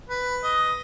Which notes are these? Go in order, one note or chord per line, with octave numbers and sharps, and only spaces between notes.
B4
D#5